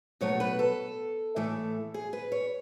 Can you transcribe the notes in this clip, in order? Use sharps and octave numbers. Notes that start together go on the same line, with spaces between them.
B2 F#3 A3 C#5
B4
A4
A2 E3 A3
G#4
B4
C#5